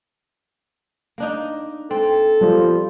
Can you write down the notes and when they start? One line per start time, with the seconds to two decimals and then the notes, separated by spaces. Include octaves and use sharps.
1.18 A#3 D4 D#4
1.91 C4 A4
2.41 F3 G3